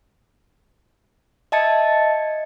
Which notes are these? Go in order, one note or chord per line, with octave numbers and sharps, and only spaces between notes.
D#5 E5 A5 G#6 A6 C#7